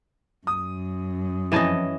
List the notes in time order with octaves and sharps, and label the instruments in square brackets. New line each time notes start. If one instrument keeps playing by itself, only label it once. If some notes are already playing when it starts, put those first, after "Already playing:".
[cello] F#2 [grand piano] D#6
[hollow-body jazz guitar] F2 G#5 A5 [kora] E3 D#5 [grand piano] C#4 E7